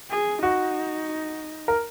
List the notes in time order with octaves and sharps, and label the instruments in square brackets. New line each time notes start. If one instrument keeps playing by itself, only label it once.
[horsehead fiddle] G#4
[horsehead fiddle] D#4 [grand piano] F#4
[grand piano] A#4